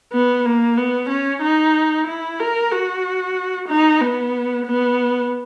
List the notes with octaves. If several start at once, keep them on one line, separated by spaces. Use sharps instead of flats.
B3
A#3
B3
C#4
D#4
E4
A#4
F#4
D#4
B3
B3